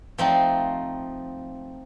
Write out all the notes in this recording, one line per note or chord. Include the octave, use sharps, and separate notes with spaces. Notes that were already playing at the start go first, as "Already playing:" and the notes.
F3 A3 C4 D#4